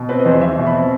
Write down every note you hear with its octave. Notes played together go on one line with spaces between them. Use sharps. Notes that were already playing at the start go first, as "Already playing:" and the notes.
Already playing: B2
C4 B4
D#5
E2 C5
E2 E5
B2
B5
C4